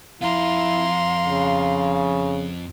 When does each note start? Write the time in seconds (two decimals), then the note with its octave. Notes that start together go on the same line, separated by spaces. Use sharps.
0.21 F2 E4 F4 F5 A#5 C6
1.26 C#3